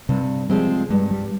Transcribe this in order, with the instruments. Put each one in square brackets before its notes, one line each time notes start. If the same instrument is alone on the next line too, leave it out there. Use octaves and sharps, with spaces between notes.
[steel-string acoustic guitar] G2 [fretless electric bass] C3
[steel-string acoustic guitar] F3 G#3 C4 [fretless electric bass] G3
[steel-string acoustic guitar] G2 [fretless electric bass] G#3
[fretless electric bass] G3